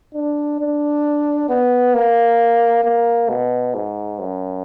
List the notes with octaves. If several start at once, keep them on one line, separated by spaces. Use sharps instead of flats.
D4
D4
B3
A#3
A#3
B2
G#2
F#2